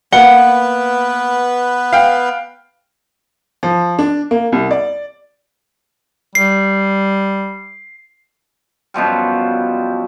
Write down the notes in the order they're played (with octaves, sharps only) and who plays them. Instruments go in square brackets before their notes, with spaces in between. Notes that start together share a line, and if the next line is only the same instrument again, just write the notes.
[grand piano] A#3 G7 [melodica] B3 B4 [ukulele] F#5
[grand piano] F5 G5
[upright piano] F3
D4
A#3
C2
D5
[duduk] G3 [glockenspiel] C7
[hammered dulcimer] F#2 B2 F3 G3